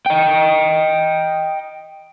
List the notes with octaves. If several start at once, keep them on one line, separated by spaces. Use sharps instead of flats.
D#5 G5